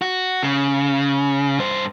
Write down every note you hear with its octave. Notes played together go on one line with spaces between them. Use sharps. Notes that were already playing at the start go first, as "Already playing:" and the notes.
F#4
C#3
G2 C5